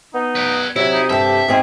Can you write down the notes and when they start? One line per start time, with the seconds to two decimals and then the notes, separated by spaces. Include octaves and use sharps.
0.14 B3 D#4
0.35 B4 D5
0.76 C3 F#3 E4 E5
0.92 D#4
1.10 G2 G4 A4 E5
1.48 G#2 C4 G#4